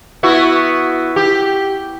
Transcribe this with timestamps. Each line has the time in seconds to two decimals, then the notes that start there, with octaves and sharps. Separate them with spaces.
0.23 B3 E4 F#4
1.16 G4